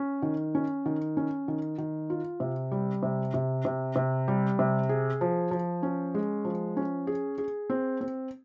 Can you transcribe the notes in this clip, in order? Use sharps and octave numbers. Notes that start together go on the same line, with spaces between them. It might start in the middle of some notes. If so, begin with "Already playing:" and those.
Already playing: C#4
D#3
C#4
D#3
C#4
D#3
D#3
F4
C3
G3
C3
C3
C3
C3
G3
C3
G#4
F3
F3
C#4
G#3
F3
C#4
G#4
G#4
C4
C4